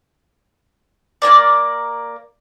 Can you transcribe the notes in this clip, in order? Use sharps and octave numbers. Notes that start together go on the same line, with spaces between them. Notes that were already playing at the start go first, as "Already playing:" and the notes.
A#3 C#4 A#4 D5